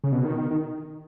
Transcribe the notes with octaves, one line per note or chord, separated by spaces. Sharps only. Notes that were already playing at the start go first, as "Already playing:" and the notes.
C#3
B2
D#3
D#3
D#3